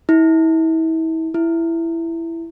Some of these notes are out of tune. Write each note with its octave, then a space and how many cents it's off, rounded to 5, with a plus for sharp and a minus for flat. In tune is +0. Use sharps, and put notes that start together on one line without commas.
E4 -35
E4 +10